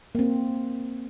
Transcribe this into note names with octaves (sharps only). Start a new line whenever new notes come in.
A#3 C4